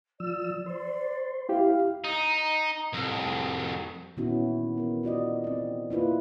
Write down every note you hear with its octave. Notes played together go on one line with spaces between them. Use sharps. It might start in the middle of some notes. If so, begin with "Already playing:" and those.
F3 D5 E6
C5 D5
E4 G4 F5
D#4
C2 F2
A#2 D#3 B3 C#4 E4 F#4
E3 B3 A#4
F4 F#4 D5 D#5
C4 D5
A#3 E4 F4 B4